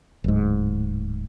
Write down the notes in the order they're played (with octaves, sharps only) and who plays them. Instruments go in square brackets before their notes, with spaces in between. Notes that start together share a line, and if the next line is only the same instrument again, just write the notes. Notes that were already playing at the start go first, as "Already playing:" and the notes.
[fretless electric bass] D1 G#2